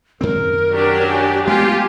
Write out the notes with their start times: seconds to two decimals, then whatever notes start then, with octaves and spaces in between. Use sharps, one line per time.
0.21 F#2 D#3 C4 A#4
0.71 F#3 D4 G4
1.10 G#5
1.48 G#3 A3 B3 F4 G4 G#5